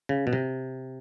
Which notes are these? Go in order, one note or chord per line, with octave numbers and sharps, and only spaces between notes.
C#3
B2
C3